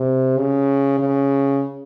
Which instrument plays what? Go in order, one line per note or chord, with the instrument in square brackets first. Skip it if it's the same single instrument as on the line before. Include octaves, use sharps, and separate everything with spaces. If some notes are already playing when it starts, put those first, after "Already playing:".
Already playing: [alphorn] C3
C#3
C#3